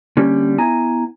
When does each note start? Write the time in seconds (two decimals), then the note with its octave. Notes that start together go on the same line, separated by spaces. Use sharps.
0.17 D3 G3 A#3 C#4
0.58 B3 E4 G#5 A#5